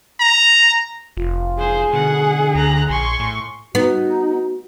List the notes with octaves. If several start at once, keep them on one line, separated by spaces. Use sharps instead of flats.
A#5
F1 F4
G#4 C5
B2 D3 F#5
D2 A#5 F#6
A#1 G#5 C6 C#6
A2
B3 D#4 F#4